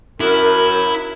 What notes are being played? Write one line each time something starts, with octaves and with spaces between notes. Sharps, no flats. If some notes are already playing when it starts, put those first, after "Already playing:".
F#2 E4 A#4